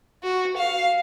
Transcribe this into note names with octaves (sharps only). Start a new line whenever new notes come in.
F#4
F5